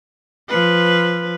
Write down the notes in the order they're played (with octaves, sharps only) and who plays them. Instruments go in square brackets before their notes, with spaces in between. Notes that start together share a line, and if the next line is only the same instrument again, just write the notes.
[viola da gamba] F3 B4